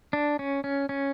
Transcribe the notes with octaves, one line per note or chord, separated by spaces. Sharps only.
D4
C#4
C#4
C#4